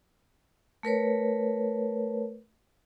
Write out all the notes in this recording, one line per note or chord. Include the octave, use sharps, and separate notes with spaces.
A3 A#4 B4 C#5